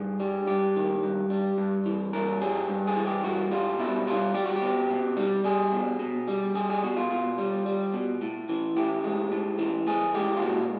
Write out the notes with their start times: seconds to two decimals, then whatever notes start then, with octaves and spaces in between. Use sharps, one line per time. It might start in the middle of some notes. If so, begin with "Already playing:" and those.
Already playing: G2 G#4
0.20 G3
0.47 G2 G4
0.76 D#3
1.03 G2
1.30 G3
1.58 G2
1.85 E3
2.13 G2 A#4
2.41 G3 G#4
2.69 G2
2.87 G#4
2.96 E3
3.06 G4
3.23 G2 F#4
3.51 G3 F4
3.79 B2 E4
4.07 G3 F4
4.35 G3 G4
4.45 F#4
4.56 G4
4.62 B2
4.90 B2
5.17 G3
5.44 G3 G#4
5.72 B2
6.00 B2
6.28 G3
6.55 G3 G#4
6.70 G#4
6.83 B2 F#4
6.97 F4
7.10 B2 F4
7.38 G3
7.66 G3
7.94 B2
8.22 A2
8.49 E3
8.77 A2 G4
9.04 G#3
9.32 A2
9.59 E3
9.87 A2 G#4
10.14 G#3 G4
10.37 F4
10.42 A#2 F#4